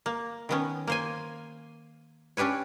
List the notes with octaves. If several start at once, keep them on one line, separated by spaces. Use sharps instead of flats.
A#3
D#3 B3 C#4
A#3 C5 G#5
C#4 D4 G4 B4 C#5